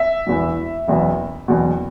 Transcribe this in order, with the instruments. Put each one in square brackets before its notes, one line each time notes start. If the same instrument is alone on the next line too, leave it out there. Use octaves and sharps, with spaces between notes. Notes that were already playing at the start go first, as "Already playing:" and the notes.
Already playing: [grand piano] E5
E1 E2 E3
F#1 E2 B2
F#1 E2 B2